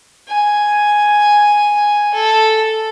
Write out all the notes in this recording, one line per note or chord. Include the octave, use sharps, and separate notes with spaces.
G#5
A4